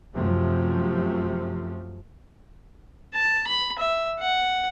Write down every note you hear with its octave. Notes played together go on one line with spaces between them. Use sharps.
F#2 C3 F3 A3
A5
B5
E5
F#5